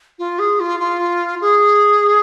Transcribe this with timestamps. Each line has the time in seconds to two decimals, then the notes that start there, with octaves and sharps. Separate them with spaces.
0.19 F4
0.39 G#4
0.60 F4
0.80 F4
1.41 G#4